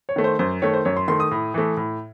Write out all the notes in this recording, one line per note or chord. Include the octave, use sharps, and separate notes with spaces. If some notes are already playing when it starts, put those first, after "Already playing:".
C#5
D#3 A3
C5
F#2 C5
D#3 A3 C#5
C5
F#2 C#5
C6
D#3 A3 C6
D#6
A2
E3 A3
A2